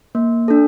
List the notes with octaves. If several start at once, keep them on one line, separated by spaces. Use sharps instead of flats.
A#3
D4 A4